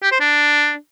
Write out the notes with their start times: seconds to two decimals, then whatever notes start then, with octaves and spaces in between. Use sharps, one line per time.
0.03 G4
0.11 C5
0.20 D4